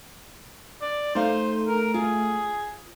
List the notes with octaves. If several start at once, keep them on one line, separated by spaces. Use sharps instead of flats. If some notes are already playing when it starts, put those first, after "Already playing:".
D5
A3 D#4 C5 F5
A#4
F4 G#4